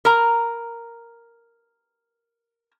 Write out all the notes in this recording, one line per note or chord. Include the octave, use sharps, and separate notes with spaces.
A#4 A#5